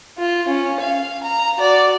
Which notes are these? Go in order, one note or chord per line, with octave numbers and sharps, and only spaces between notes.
F4
C#4
F5
A#5
F#4 D5